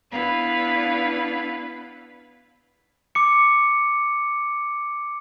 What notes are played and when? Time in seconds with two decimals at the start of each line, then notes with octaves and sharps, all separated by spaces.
0.11 B3 D4 E4 B4 F5
3.15 D6 C#7